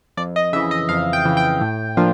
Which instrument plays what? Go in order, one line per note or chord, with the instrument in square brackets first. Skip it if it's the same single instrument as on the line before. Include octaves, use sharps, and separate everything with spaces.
[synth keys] F2 D5
D#5
C#3 E5
E3
D#5
F2 F5
G5
C#3 E3
G5
A2
F3 A#3 D4 F4